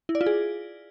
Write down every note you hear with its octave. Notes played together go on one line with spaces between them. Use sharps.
E4
D5
F4
G#4